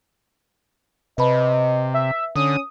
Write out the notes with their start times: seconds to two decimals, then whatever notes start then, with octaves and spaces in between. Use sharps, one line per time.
1.18 C3 B4 D#5 A5 B5
1.94 E5
2.36 D3 C#4 D#6